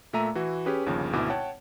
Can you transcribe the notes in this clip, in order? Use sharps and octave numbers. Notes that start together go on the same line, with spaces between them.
A#2 A3 E5 A#5 D#7
E3 E4 F#4
C#4 G4 G#4 B4
G1 D#2 C#3 F3
G#1 D2 B2 E4 D6
C#5 F#5 G5 A5